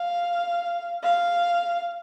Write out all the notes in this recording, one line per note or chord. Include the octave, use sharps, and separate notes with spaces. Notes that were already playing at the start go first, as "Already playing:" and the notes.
Already playing: F5
F5